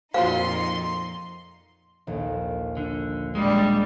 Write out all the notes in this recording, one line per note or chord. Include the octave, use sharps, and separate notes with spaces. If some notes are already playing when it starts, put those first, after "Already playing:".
F2 A#2 D#4 F4 F#4 C5 F5 C6
A#1 D#2
D3
A#2 G3 G#3 D4